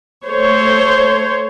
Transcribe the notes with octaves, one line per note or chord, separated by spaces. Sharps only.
A3 C5 C#5